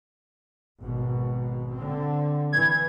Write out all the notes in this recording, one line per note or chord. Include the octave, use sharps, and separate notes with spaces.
G#1 B2
D3 C4
E3 G#6